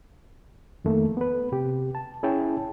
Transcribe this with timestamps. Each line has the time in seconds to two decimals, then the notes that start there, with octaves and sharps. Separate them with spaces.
0.84 F2 D#3 A3 A#3
1.17 B3 B4
1.52 C3 G4
1.95 A5
2.23 C#4 E4 G#4 C#5 G5 A5